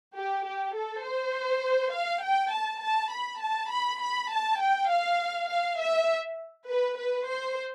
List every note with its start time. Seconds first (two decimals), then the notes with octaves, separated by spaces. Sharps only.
0.16 G4
0.47 G4
0.76 A4
1.06 C5
1.95 F5
2.24 G5
2.54 A5
2.84 A5
3.13 B5
3.43 A5
3.72 B5
4.01 B5
4.31 A5
4.61 G5
4.91 F5
5.49 F5
5.80 E5
6.68 B4
6.98 B4
7.27 C5